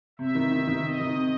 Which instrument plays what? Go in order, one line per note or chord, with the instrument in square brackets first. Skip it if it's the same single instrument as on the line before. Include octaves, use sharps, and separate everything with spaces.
[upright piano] C3 [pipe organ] E5
[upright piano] D#3
D#3
D#3
[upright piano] C3 [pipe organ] D#5
[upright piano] D#3
C3